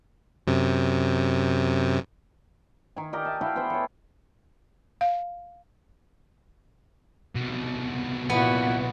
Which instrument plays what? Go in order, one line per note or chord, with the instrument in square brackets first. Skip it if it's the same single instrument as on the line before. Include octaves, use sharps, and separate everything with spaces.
[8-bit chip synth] F#2 C3
[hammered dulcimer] D#3 G#5
G4 A#4 D5 D#5
E5 G#5 A5
E4 F#4 F5 G5
B3 G#4 C5 G5
A4 C#5
[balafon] F5
[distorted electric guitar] C2 B2
[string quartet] A#2 E4 F#4 [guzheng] B3